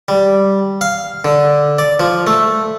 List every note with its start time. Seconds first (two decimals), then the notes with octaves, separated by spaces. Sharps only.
0.08 G3
0.81 F5
1.25 D3
1.79 D5
2.00 F3
2.27 A3